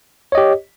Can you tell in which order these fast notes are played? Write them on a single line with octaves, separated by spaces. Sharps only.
C#5 D#5 G4